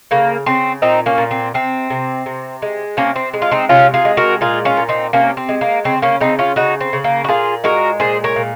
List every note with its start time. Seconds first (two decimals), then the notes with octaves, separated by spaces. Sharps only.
0.11 C#3 A#3
0.46 C#3 C4
0.82 A#2 C4 D#4
1.06 A#3 C#4
1.18 A#2
1.31 C4
1.54 C3 C4
1.90 C3
2.26 C3
2.62 G#3
2.97 C3 A#3 C#4
3.16 C4
3.34 G#3
3.42 F4
3.51 C4 D#4
3.69 C3 C#4 F4
3.94 F4 G#4
4.05 G#3
4.17 F#4 A#4
4.41 A#2 F4 G#4
4.65 C#4 F4
4.77 A#2
4.89 C4 D#4
5.13 C3 A#3 C#4
5.37 C4
5.49 G#3
5.61 A#3
5.84 C#3 C4
6.02 A#3 C#4
6.20 C#3 C4 D#4
6.39 C#4 F4
6.56 C#3 D#4 F#4
6.80 C4
6.93 C#3
7.04 A#3
7.24 F#4
7.28 A#2 F4 G#4
7.64 G#3 F#4 A#4
8.00 A#2 G#4 C5
8.24 A#4 C#5
8.36 A#2